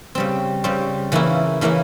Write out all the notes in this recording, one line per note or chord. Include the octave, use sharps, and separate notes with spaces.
C#3 G3 C4
C#3 G3 C4
C#3 E3 A#3 C#4 E4
C#3 E3 A#3 C#4 E4